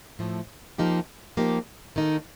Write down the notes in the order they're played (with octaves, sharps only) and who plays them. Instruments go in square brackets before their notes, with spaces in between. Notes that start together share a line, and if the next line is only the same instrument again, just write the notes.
[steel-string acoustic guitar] A2 F3 A3
F3 A#3 D#4 G4
F3 A#3 D#4 G4
D#3 A#3 D#4 A4